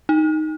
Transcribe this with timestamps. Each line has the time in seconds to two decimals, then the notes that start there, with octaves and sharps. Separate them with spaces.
0.09 D#4